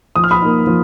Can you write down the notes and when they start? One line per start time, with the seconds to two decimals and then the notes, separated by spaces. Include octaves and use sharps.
0.16 F3 D#6
0.24 F6
0.31 B5 D#6
0.41 A#3 D#4
0.67 F3